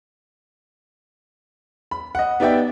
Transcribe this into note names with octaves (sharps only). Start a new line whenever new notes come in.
B5
D#5 F#5
B3 D#4 G4 D5 E5 G5